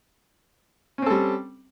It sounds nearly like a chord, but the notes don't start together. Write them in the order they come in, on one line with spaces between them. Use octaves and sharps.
C#4 C4 A4 G3